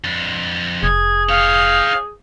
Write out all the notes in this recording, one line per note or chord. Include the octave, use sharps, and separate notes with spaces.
F2 D4
F1 G#4 G#6
D#4 C#5 F5